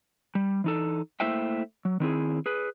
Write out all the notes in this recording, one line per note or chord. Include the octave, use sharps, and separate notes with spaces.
G3
E3 D#4 A4
A3 A#3 E4 C5 E5 G5
F#3
D#3 C4 E4 G#4
G#4 B4